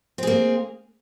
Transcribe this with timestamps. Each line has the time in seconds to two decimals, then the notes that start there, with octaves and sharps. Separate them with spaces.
0.18 C4
0.23 G#4
0.27 A#3